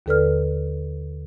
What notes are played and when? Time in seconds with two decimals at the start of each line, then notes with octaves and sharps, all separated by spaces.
0.06 D#2 D3 A4 B4 D5 F6